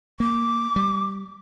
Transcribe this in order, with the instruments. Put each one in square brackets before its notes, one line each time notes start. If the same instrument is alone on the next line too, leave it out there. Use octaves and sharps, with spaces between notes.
[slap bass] A#3 [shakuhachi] D6
[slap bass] G3